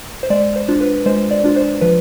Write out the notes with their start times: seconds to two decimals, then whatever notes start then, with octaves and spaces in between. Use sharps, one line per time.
0.23 C5
0.30 G#3 D5
0.56 C5
0.68 D4 F4
0.81 B4
1.06 G#3 C5
1.31 D5
1.44 D4 F4
1.56 C5
1.81 F3 B4